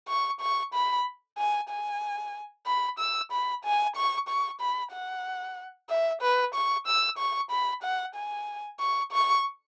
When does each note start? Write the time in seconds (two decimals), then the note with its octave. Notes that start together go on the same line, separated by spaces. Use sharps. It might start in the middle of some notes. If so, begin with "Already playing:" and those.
0.08 C#6
0.40 C#6
0.74 B5
1.38 G#5
1.70 G#5
2.66 B5
2.99 E6
3.32 B5
3.64 G#5
3.96 C#6
4.28 C#6
4.61 B5
4.92 F#5
5.90 E5
6.22 B4
6.55 C#6
6.87 E6
7.18 C#6
7.51 B5
7.83 F#5
8.15 G#5
8.80 C#6
9.12 C#6